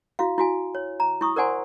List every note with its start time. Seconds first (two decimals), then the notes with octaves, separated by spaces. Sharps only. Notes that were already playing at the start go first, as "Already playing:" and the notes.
0.19 E4 F#4 F5
0.38 E4 F#4 G#5
0.75 C#5
1.00 A#5
1.21 E4 C#6 D#6
1.36 A#4 C5 D5 F#5 G#5 C6